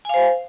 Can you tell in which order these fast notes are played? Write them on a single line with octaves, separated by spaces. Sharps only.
G#5 F5 C5